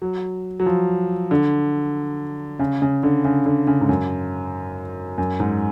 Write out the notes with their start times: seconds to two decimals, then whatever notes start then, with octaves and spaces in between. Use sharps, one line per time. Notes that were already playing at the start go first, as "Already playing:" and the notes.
0.02 F#3
0.60 F#3
0.66 F3
1.31 D3
2.59 C#3
2.82 C#3
3.03 D3
3.25 C#3
3.46 D3
3.67 C#3
3.81 G#2
3.89 F#2
5.18 F#2
5.40 G#2